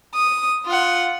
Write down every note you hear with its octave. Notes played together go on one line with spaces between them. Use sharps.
D#6
F4 F#5